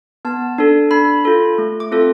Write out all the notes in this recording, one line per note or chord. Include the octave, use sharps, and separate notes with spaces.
B3 A5
D4 A4
D4 B5
F4 A4
A3
D6
C4 F4 A4